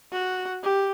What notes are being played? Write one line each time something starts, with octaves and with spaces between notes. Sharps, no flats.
F#4
G4